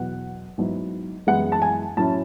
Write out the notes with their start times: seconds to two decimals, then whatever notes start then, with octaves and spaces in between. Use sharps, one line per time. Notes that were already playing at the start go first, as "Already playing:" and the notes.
Already playing: E2 B2 F#3 B3 F#5
0.58 G#2 F#3 B3 E4
1.27 F#2 E3 G#3 B3 E4 F#5
1.52 A5
1.62 G#5
1.97 A2 F#3 C#4 E4 A5